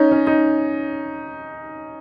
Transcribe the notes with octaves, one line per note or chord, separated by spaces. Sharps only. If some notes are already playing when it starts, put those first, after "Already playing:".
Already playing: C#4 D#4
C#4
D#4